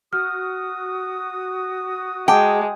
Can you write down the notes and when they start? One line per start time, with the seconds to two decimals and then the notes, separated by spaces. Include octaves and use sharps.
0.13 F#4 D#6 F6
2.28 G#3 F#5 G5 A5 D6